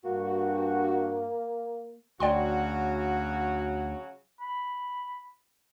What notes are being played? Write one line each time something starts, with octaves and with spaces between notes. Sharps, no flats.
G2 A#3 F#4
D2 C#3 F#3 F#4 D5 G5 C6
B5